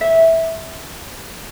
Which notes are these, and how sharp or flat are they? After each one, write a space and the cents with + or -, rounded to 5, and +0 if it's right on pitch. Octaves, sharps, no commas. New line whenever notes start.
E5 -10